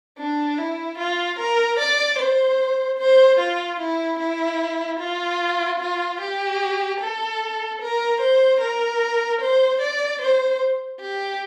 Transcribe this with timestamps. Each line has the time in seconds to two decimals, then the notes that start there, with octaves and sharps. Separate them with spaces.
0.19 D4
0.58 E4
0.98 F4
1.39 A#4
1.79 D5
2.19 C5
2.99 C5
3.39 F4
3.80 E4
4.19 E4
5.00 F4
5.80 F4
6.20 G4
7.00 A4
7.81 A#4
8.21 C5
8.61 A#4
9.41 C5
9.81 D5
10.21 C5
11.01 G4